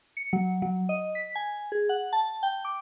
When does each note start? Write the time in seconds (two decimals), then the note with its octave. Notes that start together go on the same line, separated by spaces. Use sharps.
0.17 C#7
0.33 F#3
0.62 F#3
0.89 D#5
1.15 B6
1.35 G#5
1.72 G#4
1.89 F#5
2.13 A5
2.43 G5
2.65 D6